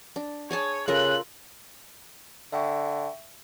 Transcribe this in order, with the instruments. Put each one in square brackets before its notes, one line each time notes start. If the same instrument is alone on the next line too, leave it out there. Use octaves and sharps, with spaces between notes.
[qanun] D4
[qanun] G#4 G#5 A5 [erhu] C#5
[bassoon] C#3 [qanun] F4 A4 A#4 [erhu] F#6
[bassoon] D3 [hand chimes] E5 G5 C#6